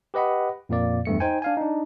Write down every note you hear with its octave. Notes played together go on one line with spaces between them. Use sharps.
G4 B4 D#5 F#5 B5
F2 A#2 A#3 D5
E2 G2 A3 C#7
D#4 C5 G5 G#5
D4 F5 G#5
D4 D#4